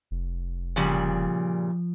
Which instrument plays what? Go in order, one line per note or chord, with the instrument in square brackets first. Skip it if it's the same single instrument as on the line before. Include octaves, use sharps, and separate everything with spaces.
[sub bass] F1
[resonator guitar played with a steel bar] A#2 C#3 G3 [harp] F3